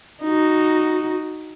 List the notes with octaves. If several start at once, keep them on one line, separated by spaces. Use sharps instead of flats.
D#4 F#4